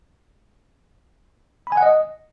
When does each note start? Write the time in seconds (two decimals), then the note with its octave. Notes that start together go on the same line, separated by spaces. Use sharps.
1.67 B5
1.72 G#5
1.77 F#5
1.82 D#5